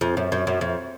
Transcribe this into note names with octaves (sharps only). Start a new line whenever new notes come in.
F2
F#2
F#2
F#2
F2